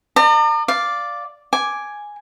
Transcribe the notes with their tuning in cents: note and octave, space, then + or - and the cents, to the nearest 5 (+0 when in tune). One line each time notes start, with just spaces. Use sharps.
D5 +45 A#5 -40
D5 +0 F5 +0
G#5 +0 D6 +0